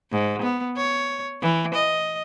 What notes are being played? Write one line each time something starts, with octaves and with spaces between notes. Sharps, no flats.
G#2
B3
C#5
E3
D#5